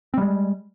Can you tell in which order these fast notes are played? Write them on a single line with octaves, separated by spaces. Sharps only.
C4 G3 G#3